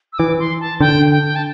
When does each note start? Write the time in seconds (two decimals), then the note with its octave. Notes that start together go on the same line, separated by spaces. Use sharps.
0.13 E6
0.19 E3 D6
0.39 C6
0.60 A5
0.80 D3 G5
1.11 G5
1.36 A5